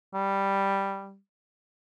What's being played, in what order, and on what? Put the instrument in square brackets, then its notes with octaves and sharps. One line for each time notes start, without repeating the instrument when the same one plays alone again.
[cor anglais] G3